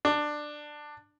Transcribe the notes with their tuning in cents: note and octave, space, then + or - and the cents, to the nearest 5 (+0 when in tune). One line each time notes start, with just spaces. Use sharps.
D4 +15